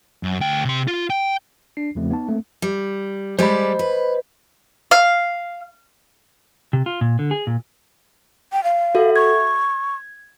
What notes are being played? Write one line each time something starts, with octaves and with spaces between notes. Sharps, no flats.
F#2
D2 G5
C3 C6
F4
G5
D4 C7
E2 C#3 F3 A3 C4
B3 D#4 A5
A3 A#3 C4
G3
G3 G#3 C5 D5 D#5 B5
B4
F5
C3
F4
A#2
D3
G#4
A#2
G5
F5
F#4 A4 E5
C#6 G#6